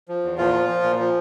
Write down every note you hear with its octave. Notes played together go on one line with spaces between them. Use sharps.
F3
E2
A#2 F3 F4
F3
F3
A#2
F3